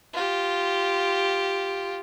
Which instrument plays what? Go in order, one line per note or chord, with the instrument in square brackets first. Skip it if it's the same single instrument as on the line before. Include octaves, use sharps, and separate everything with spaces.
[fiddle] F4 G4